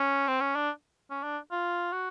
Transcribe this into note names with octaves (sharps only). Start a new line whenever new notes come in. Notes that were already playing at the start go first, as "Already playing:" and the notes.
Already playing: C#4
C4
C#4
D4
C#4
D4
F4
F#4